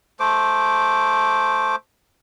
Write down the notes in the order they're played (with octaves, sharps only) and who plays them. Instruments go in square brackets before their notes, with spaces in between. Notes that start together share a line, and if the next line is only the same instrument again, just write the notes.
[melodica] A3 C5 D6